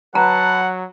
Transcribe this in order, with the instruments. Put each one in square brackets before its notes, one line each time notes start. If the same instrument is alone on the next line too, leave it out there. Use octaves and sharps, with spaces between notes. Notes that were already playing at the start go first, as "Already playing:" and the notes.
[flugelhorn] F#3 [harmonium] B4 A5 [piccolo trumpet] F#5 [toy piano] A#5